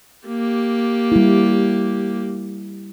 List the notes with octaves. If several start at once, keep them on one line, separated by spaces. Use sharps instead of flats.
A#3 G4
G3 E4